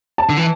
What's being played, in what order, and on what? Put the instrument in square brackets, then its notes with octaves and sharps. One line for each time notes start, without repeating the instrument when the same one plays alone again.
[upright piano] A5
[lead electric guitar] D3
E3